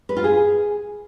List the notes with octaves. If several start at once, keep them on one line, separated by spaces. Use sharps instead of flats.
B4
F4
G#4